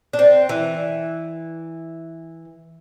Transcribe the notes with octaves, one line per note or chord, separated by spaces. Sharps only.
D4
C4
E3